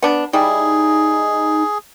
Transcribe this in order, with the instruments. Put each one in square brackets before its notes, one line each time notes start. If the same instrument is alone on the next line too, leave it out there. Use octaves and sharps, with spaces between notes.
[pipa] B3 D4
[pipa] G3 E4 [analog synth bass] D#4 [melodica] G#4